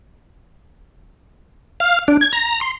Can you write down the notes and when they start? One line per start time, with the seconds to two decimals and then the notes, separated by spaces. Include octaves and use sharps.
1.80 F5
2.08 D4
2.21 G#6
2.33 A#5
2.61 C6